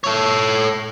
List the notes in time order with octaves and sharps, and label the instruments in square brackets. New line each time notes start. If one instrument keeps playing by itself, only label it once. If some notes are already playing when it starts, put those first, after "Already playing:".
[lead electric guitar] A4 C#5